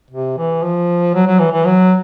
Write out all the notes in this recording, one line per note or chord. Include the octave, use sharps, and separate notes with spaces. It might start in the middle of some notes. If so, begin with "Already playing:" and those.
C3
E3
F3
F#3
F#3
E3
E3
F#3